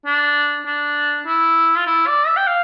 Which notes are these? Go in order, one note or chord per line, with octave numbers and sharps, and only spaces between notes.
D4
D4
E4
F4
E4
D5
E5
G5
F5